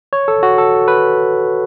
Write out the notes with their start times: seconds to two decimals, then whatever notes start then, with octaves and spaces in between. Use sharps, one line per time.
0.13 C#5
0.28 A4
0.43 F#4
0.58 A4
0.88 B4